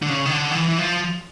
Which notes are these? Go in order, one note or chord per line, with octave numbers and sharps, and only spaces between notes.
D3
C#3
D#3
D3
D#3
E3
E3
F3